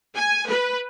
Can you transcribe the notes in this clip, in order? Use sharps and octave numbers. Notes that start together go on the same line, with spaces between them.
G#5
B4